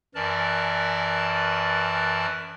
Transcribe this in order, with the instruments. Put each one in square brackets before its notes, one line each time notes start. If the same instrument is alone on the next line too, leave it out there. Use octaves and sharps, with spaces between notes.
[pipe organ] F#2 E3 A#4 D5 A5